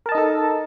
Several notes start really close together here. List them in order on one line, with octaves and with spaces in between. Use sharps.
A#4 A5 D#5 D#4 A4